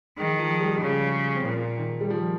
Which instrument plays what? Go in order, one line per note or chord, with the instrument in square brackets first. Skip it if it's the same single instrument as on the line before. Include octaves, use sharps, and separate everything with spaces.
[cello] D#3 [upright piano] G#3
[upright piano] F3
G3
[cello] C#3 [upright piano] G#3
[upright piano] C4
[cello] A#2 [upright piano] A#3
[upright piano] D#3
G3
F3